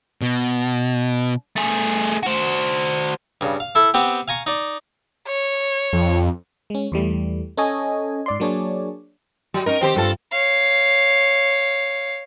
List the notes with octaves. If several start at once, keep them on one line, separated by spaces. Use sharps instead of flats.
B2
A3 G#4
F#4 C5
G2 C#3
F5
E4 A4
B3 C4 G4
F5 G#5 A#5 C#6
D#4 D5
C#5
F2
G#3 C#4
E2 E3 G3 A3
C#4 A4 C#5 D#5 G#5
G#2 D5 C6
F#3 A#3 D4 G#4 C#5 D5
F#3 G4
C#4 D#4 A#4 D#5
D#3 C4 G4 C5 G5
G2 C4 F4 A4 F5
C#5 F5